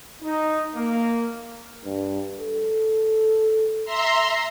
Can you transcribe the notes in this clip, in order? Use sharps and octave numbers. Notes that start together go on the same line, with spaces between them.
D#4
A#3
G2
A4
E5 A#5 C6